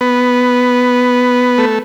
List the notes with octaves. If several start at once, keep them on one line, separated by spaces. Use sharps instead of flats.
B3
A3